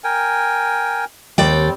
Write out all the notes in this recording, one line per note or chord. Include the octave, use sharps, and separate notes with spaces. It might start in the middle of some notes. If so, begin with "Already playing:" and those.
A#4 G5 G#5
D#2 G3 C4 D5 G5